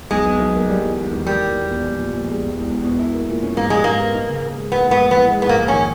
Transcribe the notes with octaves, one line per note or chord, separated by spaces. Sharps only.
B1 G#3
B2
B1
A#3
G3
E2
E1
D#3
G3 A#3
E2
E1
B2
A#1
A#2
A#1
G#3
E1
E2
E1
B2
E4
A#3
A#2
C#4
G#2 A#3
G3 G#3
G#2 A#3
B3
D#4
C#3
D#2
G#3
A#3 B3
G#2 B3
A#1
E3 B3
G#3
B3
G#2 A#3
A#1
C#4
D#3